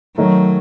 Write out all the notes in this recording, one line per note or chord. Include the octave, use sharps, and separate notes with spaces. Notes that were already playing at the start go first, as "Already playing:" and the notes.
D#3 F#3 A3 D#4 A#4 C#5